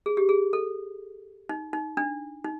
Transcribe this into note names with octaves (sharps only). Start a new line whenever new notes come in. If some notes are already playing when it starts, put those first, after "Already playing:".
G#4
G4
G#4
A4
D#4
D#4
D4
D#4